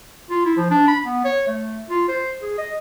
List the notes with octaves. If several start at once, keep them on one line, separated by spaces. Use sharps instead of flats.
F4
E4
F3
D4
B5
B3
C#5
A3
F4
C5
G#4
D#5